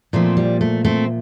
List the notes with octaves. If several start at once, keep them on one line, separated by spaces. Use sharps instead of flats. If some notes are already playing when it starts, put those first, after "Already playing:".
A#2 F3 A3 C4
G3
A3
A3 C4